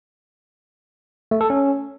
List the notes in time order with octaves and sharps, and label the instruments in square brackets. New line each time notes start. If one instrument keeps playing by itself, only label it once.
[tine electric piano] A3
A4
C#4